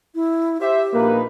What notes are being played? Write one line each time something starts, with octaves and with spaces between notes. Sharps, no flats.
E4
G4 C5 E5
A#1 A#3 D#4 B4